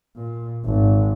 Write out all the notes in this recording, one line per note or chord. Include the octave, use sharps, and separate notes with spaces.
A#2
G#1